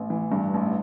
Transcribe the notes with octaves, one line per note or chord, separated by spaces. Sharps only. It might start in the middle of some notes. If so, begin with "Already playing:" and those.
Already playing: A1 B3
E3
G2
A1